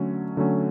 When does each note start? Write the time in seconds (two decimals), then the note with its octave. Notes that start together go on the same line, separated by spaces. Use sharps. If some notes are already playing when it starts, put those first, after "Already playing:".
Already playing: D3 F#3 A3 C#4
0.37 D3 F#3 A3 C#4